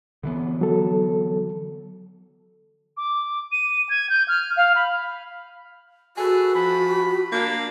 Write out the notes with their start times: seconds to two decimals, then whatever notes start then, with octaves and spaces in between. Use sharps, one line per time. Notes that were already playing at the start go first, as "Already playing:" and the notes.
0.23 D3 E3 B3
0.61 F#3 A4
2.97 D6
3.52 D#7
3.89 G#6
4.10 G6
4.28 F6
4.57 F5
4.76 B5
6.17 F#4 G#4 A4 B4
6.55 F3 B5
7.32 A#3 D4